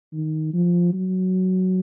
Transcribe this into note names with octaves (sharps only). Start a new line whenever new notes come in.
D#3
F3
F#3